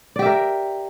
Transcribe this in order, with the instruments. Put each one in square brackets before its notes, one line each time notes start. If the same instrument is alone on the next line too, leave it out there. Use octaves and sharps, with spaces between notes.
[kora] D5
G4
E5
A#4